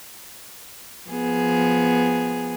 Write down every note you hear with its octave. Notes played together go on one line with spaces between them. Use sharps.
F3 B3 G#4